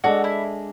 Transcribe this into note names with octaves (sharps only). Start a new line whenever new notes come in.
G#3 D4 F#4 A4 D5
E4